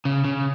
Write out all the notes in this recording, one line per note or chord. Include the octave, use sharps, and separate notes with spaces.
C#3
C#3